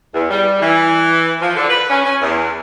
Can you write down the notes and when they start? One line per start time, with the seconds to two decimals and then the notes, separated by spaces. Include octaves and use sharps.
0.14 E2
0.30 G3
0.61 E3
1.41 F3
1.56 D3
1.70 B4
1.90 C#4
2.05 C#4
2.21 E2